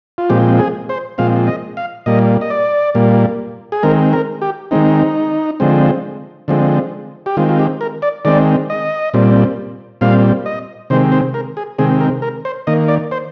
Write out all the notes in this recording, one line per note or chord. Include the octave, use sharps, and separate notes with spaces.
F4
A#2 F3 G#3 C4 G4
G#4
C5
A#2 F3 G#3 C4 F5
D#5
F5
A#2 G3 A#3 D#5
D#5
D5
A#2 G3 A#3
G#4
D#3 G#3 C4 A#4
A#4
G4
D#3 G#3 C4 D#4
D3 F3 G#3 C4
D3 F3 G#3 C4
G4
D#3 G#3 C4 F4
F4
G4
A#4
D5
D#3 G#3 C4 D5
D#5
A#2 G3 C4
A#2 G3 C4 F5
D#5
C3 D#3 G#3 C4 C5
C5
A#4
G#4
C3 D#3 G#3 C4 G#4
A#4
A#4
C5
D#3 A#3 D#5
D5
C5